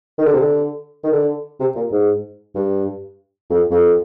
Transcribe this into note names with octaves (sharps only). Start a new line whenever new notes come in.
D#3
D3
C3
D3
D#3
D3
C3
A#2
G#2
G2
F2
F2